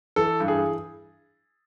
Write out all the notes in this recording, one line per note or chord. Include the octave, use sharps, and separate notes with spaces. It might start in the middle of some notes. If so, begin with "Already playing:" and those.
E3 A4
G2
G#4